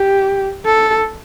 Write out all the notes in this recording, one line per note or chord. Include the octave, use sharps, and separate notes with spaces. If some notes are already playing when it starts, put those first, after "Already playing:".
Already playing: G4
A4